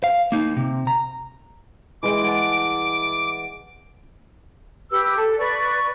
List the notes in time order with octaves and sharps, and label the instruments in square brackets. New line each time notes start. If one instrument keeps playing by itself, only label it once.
[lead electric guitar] F5
A#3 D#4
C3
A#5
[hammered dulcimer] E3 G#3 G5 [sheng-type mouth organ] D6 [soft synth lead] D7
[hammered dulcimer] F#5 G#5 A5
[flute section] G4 B4 E6
A4
B4 D5 C#6